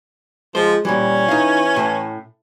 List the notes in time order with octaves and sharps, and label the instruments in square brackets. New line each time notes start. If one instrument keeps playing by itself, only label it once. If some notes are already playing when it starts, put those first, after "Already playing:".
[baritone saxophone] F3 [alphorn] G#3 [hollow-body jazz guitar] C5
[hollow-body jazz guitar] A#2 E3 [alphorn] G3 [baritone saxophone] C#4
[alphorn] E3 [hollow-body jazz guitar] D#4 F5
[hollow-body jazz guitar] A2